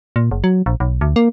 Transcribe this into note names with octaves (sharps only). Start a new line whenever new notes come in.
A#2
F#1
F#3
A#1
B1
D2
A#3